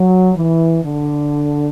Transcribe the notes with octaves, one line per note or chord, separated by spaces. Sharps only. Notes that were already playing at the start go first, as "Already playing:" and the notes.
Already playing: F#3
E3
D3